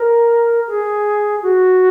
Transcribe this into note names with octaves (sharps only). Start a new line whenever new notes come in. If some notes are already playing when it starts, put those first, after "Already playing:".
Already playing: A#4
G#4
F#4